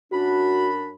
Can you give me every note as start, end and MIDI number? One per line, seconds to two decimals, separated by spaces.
0.12 0.94 42
0.12 0.94 62
0.12 0.71 66
0.12 0.94 83